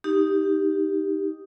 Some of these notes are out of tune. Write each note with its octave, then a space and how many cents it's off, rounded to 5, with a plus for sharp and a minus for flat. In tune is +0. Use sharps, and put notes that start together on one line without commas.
D#4 +0 G4 +0